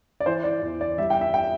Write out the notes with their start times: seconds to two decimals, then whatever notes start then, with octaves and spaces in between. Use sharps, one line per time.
0.20 D5
0.26 E3 C5
0.44 D5
0.62 E2
0.81 D5
0.98 G3 E5
1.10 G5
1.21 E5
1.34 G5